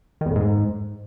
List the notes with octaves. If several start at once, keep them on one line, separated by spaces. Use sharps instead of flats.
D#3
E2
A2
G#2